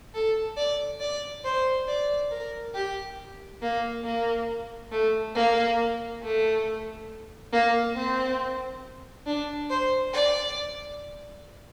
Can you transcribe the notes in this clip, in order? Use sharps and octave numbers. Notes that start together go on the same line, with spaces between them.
A4
D5
D5
C5
D5
A#4
G4
A#3
A#3
A3
A#3
A3
A#3
C4
D4
C5
D5